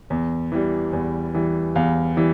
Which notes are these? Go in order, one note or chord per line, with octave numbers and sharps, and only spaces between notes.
E2
E3 G3
E2
E3 G3
E2 F5
E3 G3